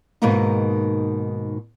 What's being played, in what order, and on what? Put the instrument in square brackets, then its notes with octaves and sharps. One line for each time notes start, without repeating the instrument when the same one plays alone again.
[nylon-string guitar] G#2 B2 D#3 A#3 B3 D#4